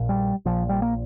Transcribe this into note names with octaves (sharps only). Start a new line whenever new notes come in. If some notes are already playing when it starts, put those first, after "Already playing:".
Already playing: A#1 A#2
G3
A#1 A#2 F3
G3
A#3